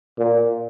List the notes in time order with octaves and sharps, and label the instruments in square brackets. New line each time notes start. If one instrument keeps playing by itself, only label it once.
[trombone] A#2